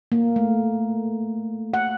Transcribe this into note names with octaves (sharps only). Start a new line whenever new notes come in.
A#3
A3
F#5